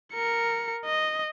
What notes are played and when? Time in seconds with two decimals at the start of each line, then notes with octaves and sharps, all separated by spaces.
0.13 A#4 C#7
0.86 D#5